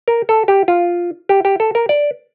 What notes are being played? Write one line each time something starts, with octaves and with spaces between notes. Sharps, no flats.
A#4
A4
G4
F4
G4
G4
A4
A#4
D5